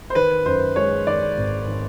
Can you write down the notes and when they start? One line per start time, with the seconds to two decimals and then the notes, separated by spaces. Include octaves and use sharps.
0.10 C5
0.15 D#3 B4
0.46 F#2 C5
0.76 G#3 C#5
1.07 D#3 D5
1.38 G#1
1.68 D#3